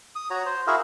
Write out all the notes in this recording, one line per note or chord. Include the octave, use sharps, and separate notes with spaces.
D#6
F#4 C#5 A#5
C5
E4 F#4 G#4 A#4 E5 F5